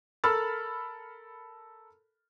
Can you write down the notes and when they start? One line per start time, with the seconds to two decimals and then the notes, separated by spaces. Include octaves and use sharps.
0.24 A4 A#4 B5 E6 F6 A6